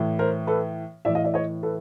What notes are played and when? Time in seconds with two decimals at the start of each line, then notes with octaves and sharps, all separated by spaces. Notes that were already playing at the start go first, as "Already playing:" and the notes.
Already playing: A2 E3
0.19 A#4 C5
0.47 A4 B4
1.05 A2 E3 D5 E5
1.15 D#5 F5
1.24 D5 E5
1.34 C#5 D#5
1.63 A4 B4